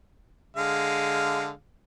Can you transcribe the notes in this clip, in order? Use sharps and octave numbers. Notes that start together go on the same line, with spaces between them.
D3 G#3 F5